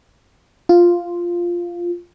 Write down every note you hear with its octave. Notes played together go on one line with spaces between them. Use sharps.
F4